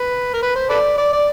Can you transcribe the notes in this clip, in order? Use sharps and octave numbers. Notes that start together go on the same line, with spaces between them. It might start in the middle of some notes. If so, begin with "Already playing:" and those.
Already playing: B4
A#4
B4
C5
A4 B4 D5
D5
D5